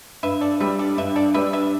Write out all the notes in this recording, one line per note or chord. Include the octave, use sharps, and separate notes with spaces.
G2 B4 E5
A4 D5
G3 D4 B4 E5
A4 D5
G2 B4 E5
A4 D5
G3 D4 B4 E5
B4 E5